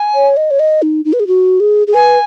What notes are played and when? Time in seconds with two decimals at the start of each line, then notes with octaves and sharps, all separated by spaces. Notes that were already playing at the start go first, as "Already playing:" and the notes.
Already playing: G#5
0.15 C#5
0.37 D#5
0.51 C#5
0.60 D#5
0.82 D#4
1.05 D#4
1.13 B4
1.20 G#4
1.27 F#4
1.60 G#4
1.87 G#4
1.94 B4 G#5